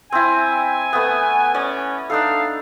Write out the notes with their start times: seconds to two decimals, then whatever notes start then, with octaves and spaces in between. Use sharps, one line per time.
0.12 C4 E4 G#5
0.93 A3 B3
1.55 C#4 D5
2.10 D4 D#4 A4 F5